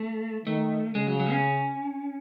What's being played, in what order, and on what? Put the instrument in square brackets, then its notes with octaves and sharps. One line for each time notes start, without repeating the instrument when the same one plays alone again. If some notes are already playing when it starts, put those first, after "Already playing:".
Already playing: [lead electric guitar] A3
[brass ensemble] D#3 [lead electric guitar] A3
[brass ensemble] C#3 [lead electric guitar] G#3
[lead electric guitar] F#3
F#3
C#4